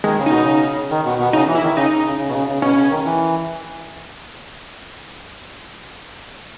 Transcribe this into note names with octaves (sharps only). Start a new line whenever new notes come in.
D#3 G#3
C#3
B2 D#4
C#3
D#3
B2
B2
C#3 D#4
E3
E4
D#3
C#3 D#4
C#3
C#3
B2
C#3
C#3
B2 C#4
C#3
D#3
E3